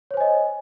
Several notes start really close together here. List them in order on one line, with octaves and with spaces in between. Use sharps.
C#5 C5 G#5 D#5